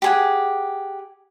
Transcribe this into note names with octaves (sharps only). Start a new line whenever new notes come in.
G4 G#4 F#5